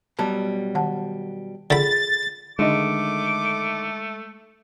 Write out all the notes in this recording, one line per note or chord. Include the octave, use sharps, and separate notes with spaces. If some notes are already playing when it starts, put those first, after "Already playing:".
B2 F#3 G3 A5
D#3 F#5 A5
D3 F4 G#4 B5 A6
D3 D#3 G#3 A3 D#5 D6